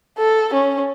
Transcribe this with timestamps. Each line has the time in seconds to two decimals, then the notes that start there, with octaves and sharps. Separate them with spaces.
0.19 A4
0.54 C#4